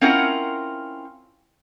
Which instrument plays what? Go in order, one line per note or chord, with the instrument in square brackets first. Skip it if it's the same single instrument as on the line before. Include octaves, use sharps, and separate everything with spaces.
[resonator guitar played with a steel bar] C4 C#4 E4 F4 A#4 F#5